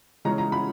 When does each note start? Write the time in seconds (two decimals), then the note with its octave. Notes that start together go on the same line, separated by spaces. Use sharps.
0.25 C#3 E3 G#3 C#4 A#5
0.38 A#5
0.52 B5